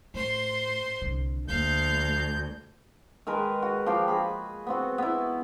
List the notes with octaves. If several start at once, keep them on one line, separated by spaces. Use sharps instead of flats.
A2 C5 C6
C2 D3
D2 F3 A#3 F5 G6
D#3 G#3 A#4 B4
F#4
F3 G4 F5 G5
F#4 G#4 B5
B3 C4 F#4
B3 E4